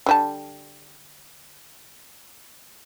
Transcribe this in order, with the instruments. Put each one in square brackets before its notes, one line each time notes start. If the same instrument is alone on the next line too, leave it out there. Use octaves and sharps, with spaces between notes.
[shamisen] D3 G3 A5